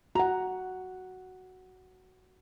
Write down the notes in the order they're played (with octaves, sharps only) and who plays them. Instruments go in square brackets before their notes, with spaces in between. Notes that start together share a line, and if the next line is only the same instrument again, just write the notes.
[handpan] F#4 F#5 [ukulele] A#5